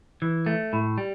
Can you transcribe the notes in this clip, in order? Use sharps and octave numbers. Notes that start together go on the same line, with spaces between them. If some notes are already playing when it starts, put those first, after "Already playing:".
E3
A3
A2
G3